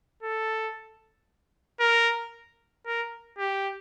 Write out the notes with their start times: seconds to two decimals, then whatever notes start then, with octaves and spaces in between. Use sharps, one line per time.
0.23 A4
1.80 A#4
2.86 A#4
3.39 G4